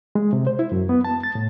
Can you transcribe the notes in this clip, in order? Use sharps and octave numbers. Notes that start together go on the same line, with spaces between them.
G#3
C3
C5
E4
F#2
B3
A5
A6
A2